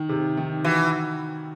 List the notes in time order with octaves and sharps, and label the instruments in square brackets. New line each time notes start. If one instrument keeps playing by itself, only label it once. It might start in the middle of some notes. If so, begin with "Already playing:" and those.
Already playing: [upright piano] D#3
C3
D#3
[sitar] E3 [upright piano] F#4